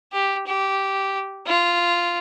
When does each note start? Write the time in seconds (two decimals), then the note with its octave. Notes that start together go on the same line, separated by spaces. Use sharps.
0.13 G4
0.47 G4
1.47 F4